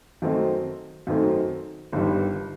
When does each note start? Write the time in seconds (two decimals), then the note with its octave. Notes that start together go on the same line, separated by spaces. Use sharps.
0.22 F#2 D#3 A3 C4 D#4
1.07 F#2 D#3 A3 C4 D#4
1.92 G1 G2 D#3 G3